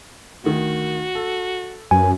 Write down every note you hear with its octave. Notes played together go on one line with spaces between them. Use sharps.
D2 D#3 F#4
A4
F#2 B4 G#5